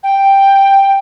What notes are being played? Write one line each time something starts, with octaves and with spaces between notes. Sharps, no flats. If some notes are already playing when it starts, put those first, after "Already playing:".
G5